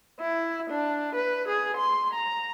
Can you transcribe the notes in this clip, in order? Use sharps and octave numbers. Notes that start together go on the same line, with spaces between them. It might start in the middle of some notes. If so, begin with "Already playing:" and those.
E4
D4
B4
G#4
C6
A#5